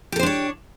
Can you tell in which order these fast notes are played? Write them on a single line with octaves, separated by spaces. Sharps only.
G4 A4 C5 D4 C#5